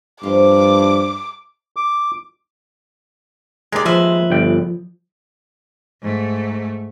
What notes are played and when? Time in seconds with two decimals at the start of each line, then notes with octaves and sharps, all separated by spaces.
0.23 G2 F3 F4 D6
1.76 D6
3.72 D#2 G#3 A#4 D5
3.85 F3 B4 C5 E5
4.30 G1 G5
6.02 G#2 A3